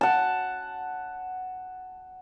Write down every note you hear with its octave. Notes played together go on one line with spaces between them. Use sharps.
F#5 A5